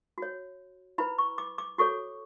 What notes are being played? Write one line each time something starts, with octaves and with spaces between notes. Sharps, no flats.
F#4 C#5
E4 B4 B5
C#6
D6
D6
F#4 A4 C#5 C#6